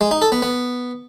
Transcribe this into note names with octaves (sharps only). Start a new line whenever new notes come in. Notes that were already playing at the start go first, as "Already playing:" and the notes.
G#3
D#4
A4
B3
B3